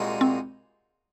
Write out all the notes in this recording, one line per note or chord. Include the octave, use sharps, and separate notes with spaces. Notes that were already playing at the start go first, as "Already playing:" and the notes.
Already playing: C2 A#2 G#3 D#4 F#4
C4